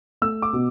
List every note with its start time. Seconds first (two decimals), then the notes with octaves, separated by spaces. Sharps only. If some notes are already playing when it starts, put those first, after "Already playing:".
0.22 A3 E6
0.42 D6
0.53 B2